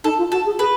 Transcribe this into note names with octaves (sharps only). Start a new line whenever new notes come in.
D#4 A4
F4
F#4 A4
G#4
G#4 B4